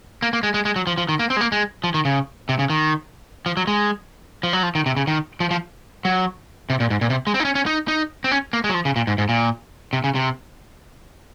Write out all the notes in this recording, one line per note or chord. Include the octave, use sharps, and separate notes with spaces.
A#3
A#3
G#3
G#3
G#3
F#3
F3
F3
D#3
A#3
C4
G#3
A#3
G#3
F3
D#3
C#3
C3
C#3
D#3
F3
F#3
G#3
F3
F#3
F3
D#3
C3
C#3
D#3
F3
F3
F#3
C3
A#2
G#2
A#2
C3
G#3
C4
D#4
C#4
C#4
D#4
D#4
C4
C#4
A#3
G#3
F#3
F3
C#3
A#2
G#2
G#2
A#2
C3
C#3
C3